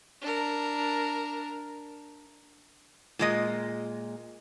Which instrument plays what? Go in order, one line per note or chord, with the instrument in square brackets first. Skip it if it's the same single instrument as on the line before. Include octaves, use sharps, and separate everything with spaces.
[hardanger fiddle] D4 A#4
[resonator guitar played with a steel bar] A#2 G#3 D#5